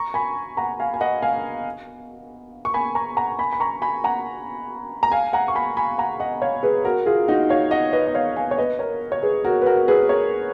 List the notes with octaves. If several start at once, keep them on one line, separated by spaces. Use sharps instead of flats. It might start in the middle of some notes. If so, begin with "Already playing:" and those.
Already playing: A#5 C#6
G#5 B5
F#5 A#5
F5 G#5
G#5
D#5 F#5
F5 G#5
C#6
G#5 B5
A#5 C#6
F#5 A#5
G#5 B5
B5
A#5 C#6
G#5 B5
F#5 A#5
A#5
F5 G#5
F#5 A#5
C#6
G#5 B5
G#5 B5
F#5 A#5
D#5 F#5
C#5 F5
G#4 B4
F#4 A#4
F4 G#4
D#4 F#4
C#5 F5
D#5 F#5
B4 D#5
D#5
C#5 F5
F5 G#5
C#5
B4 D#5
A#4 C#5
C#5
G#4 B4
F#4 A#4
B4
F#4 A#4
G#4 B4
A#4 C#5